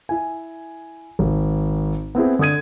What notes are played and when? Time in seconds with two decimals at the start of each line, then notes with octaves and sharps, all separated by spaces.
0.09 E4 G#5
1.19 G#1
2.15 B3 C4 E4 G#4
2.39 D3 D4 D#6 G#6 D#7